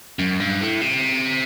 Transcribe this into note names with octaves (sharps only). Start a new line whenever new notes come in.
F#2
G2
A2
C3